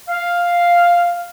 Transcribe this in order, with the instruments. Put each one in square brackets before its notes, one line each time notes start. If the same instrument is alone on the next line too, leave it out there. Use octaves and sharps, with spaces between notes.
[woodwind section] F5